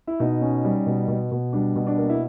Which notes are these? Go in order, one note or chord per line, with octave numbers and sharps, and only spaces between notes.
E4
B2 D#4
C#4
G3
B2
B2
B2
G3 D4
B2
D4
A#3
E4